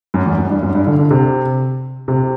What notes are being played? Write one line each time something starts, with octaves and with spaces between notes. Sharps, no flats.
F#2
E2
F#2
G2
F#2
G2
D3
D3
C3
C3